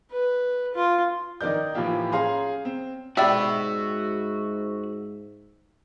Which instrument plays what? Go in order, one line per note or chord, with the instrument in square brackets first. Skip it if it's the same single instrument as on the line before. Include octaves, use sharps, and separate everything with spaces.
[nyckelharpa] B4
F4
[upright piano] D#3 D#4 A#4 D5 G6
A2 E3 F3 A#3 F4 G4
C#4 G#4 F5 G#5 A#5 C6
C4
[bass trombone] G#2 [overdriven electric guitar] F#4 B5 [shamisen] G4 D5 G5 [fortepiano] E5